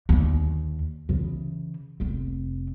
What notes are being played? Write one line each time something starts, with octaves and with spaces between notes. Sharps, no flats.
D#2 D3
C#3 E3
F1 C4